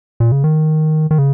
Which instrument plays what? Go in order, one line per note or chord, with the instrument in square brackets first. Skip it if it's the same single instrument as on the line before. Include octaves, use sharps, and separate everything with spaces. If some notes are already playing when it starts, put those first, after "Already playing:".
[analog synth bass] A#2
C#3
D#3
D#3
C#3